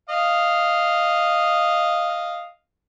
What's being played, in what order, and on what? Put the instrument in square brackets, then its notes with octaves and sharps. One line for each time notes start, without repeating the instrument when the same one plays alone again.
[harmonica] D#5 F5